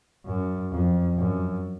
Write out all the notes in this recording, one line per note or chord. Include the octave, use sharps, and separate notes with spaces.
F#2
F2
F#2